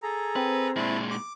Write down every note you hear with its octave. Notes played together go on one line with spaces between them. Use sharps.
G#4 A4 A#5
C4 B4
A#2 G#3 E4 A5
D6